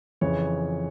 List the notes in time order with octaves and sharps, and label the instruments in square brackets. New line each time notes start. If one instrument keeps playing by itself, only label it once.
[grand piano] F2 C#3 E3 C#5